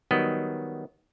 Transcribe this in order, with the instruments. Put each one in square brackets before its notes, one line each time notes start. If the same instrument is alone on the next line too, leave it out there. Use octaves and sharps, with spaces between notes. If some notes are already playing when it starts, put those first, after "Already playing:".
[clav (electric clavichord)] D#3 F#3 G3 B3 D#5